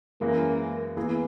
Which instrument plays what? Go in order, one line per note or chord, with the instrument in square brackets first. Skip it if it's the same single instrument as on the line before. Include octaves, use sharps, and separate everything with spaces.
[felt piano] F#2 E3 G#3 [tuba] A#3
[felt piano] E3 A#3 E4 G#4 [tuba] B3